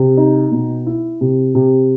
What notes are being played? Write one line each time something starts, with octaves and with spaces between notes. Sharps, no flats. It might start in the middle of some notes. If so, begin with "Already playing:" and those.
Already playing: C3
D#4
B2
E4
C3
C3